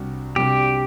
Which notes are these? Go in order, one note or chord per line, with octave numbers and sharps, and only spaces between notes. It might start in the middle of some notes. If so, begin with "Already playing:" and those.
Already playing: C2 C3 G3 D4 F#4
C2 C3 G3 D4 F#4 G4